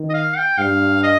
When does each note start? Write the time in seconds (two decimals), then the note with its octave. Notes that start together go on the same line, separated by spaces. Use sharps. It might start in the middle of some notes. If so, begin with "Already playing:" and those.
Already playing: D#3
0.10 D#5
0.14 F5
0.37 G5
0.58 G2 F5
1.03 D#5